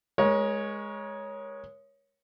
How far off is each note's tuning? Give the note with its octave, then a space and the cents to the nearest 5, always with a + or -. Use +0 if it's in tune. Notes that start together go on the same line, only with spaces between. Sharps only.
G#3 +0 A#4 +35 C#5 +0